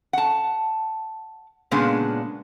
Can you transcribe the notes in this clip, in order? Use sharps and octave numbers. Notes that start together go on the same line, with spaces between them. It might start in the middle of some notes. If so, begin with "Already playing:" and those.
F#5 A5
A#2 C#3 G#3 B3 D4